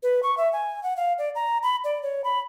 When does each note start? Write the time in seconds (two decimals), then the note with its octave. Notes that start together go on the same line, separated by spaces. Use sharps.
0.03 B4
0.23 C#6
0.37 E5
0.53 G#5
0.83 F#5
0.97 F5
1.18 D5
1.35 A#5
1.63 B5
1.84 D5
2.03 C#5
2.24 B5